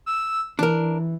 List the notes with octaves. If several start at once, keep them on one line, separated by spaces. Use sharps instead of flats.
E6
E3 D4 A#4